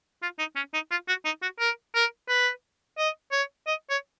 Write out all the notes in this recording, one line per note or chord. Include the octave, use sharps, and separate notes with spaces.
F4
D#4
C#4
D#4
F4
F#4
D#4
F#4
A#4
A#4
B4
D#5
C#5
D#5
C#5